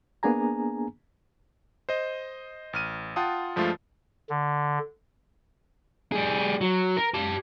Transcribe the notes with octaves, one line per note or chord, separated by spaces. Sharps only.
A#3 B3 D4 G#4 G#5 A#5
C5 D#5
A1 F6 D#7
F4 F#5 G5 A5 D#6
G2 F3 G#3 A3 F4
D3
G3 G#4
F#3
A#4
G4 A5